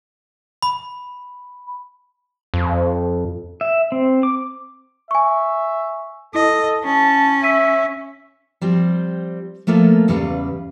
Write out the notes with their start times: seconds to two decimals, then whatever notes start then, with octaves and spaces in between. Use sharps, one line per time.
0.62 B5
2.54 F2
3.61 E5
3.92 C4
4.23 D6
5.11 E5 G#5 C#6
6.35 E4 A4 D#5
6.84 C#4 A5
7.43 E5 E6 B6 D#7
8.61 F3 G3 C4
9.67 F3 A3 A#3 F4 A4
10.08 E2 C#3 G3 B4 F5